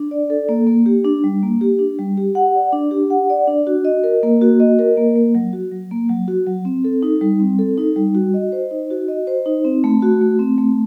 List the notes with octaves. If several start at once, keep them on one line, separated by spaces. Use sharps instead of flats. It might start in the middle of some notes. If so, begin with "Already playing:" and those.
Already playing: D4
D5
A4
A#3
A#3
G4
D4
G3
A#3
G4
D4
G3
G4
F#5
D5
D4
G4
F#5
D5
D4
F#4
D#5
A#4
A#3
F#4
D#5
A#4
A#3
A#3
F#3
F#4
F#3
A#3
F#3
F#4
F#3
C4
A4
D#4
G3
C4
A4
D#4
G3
F#4
D#5
C5
D#4
F#4
D#5
C5
D#4
C4
A3
F#4
A3
C4
A3